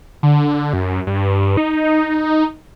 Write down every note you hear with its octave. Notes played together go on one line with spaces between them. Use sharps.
D3
F#2
G2
D#4